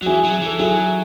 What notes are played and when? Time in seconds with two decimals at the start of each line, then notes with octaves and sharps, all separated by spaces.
0.01 F#3 F#4
0.06 E3 E4 G#4
0.24 F#3
0.32 G#4
0.41 E3
0.46 A4
0.59 F#3 E4 G#4